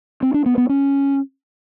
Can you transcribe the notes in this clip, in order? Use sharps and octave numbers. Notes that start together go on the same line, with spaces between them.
C4
D4
B3
B3
C#4